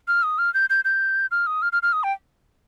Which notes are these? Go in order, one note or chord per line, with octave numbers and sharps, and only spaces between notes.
F6
D#6
F6
G6
G6
G6
F6
D#6
F6
F6
F6
D#6
G5